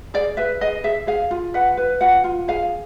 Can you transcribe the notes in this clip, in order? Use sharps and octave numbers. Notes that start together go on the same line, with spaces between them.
G#4 D5
B4 E5
G#4 D#5
G#4 E5
G#4 F5
F4
B4 F#5
B4
F4 F#5
F4
G#4 F5